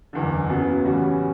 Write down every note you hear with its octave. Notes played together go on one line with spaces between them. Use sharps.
F#1 E2 D3
C#3 F#3 B3
A2 E3 G3 C#4 F#4